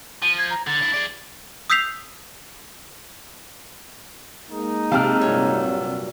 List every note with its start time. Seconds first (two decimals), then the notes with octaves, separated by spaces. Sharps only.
0.23 F3 D#7
0.38 G#6
0.50 A#5
0.67 D3 A6
0.82 D4 E4
0.94 G#4 D5
1.70 D#6 E6 G6 B6 C7 F7
4.49 G#3 A#3 D#4
4.92 C3 F5 G5 A5 F6
5.21 G2 A#2 F#3 C#5